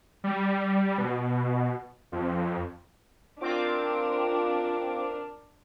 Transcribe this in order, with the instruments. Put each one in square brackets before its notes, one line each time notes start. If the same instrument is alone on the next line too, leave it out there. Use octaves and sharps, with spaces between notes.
[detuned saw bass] G3
B2
F2
[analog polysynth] C4 F4 D6 [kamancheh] D4 A#4